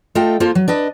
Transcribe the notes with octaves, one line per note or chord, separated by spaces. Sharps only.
A3 F4 A4 D#5 G5
A#3 F4 A4 C5
F#3
D4 B4 D#5